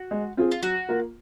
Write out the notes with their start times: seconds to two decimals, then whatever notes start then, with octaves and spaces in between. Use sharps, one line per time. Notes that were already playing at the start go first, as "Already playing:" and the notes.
Already playing: F#4
0.11 G#3
0.37 C4 F4 G#4
0.51 F4
0.62 F#3 F#4
0.89 A#3 F4 A#4